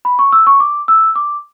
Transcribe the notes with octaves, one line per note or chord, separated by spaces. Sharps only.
B5
C#6
E6
C#6
D6
E6
D6